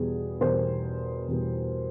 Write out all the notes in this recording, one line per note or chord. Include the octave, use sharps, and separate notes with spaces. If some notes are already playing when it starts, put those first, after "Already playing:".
Already playing: E2 B2 G3 B3 G#4
E2 B2 G3 B3 A#4 C5
E2 B2 G3 B3